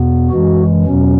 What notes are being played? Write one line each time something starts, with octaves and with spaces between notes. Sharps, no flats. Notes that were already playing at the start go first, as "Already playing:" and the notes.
Already playing: E2 B2 B3
F#2 E3 G#3 F#4
E2 B2 F#3 C#4